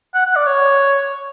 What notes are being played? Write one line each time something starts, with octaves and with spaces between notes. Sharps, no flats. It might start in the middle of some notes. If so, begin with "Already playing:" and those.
F#5
F#5
D5
C#5